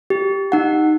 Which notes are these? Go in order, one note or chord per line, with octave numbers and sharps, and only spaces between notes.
G4
D#4 F#5